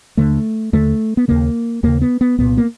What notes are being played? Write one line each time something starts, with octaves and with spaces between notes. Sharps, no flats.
D#2 D3 A3
D#2 D3 A3
B3
D#2 C#3 A#3
D#2 C#3 A#3
B3
B3
C2 A#2 B3
A#3